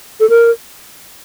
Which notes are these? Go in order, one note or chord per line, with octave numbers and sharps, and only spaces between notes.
A4
A#4